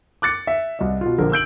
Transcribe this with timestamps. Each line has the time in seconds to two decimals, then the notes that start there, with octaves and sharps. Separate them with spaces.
0.22 D6 F#6 A6 C#7
0.47 E5
0.79 C2 D#5
1.01 B2 F4
1.18 A#1 D3 A#4
1.32 E6 G6 D7 F#7